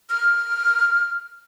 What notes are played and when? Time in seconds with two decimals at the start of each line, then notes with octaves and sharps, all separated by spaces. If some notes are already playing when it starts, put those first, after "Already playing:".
0.10 F6